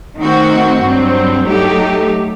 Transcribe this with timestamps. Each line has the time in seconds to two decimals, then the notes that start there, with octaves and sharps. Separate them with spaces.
0.19 D#3 A3 C4 F#4
0.81 G2 F#3 C4
1.45 F#3 A3 D#4 G4